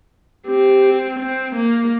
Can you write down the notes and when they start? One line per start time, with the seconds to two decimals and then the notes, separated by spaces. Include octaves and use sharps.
0.46 C4 G4
1.19 C4
1.55 A#3